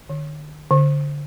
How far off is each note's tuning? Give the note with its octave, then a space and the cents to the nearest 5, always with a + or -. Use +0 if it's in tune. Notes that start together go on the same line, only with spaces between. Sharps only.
D3 +45
D3 -20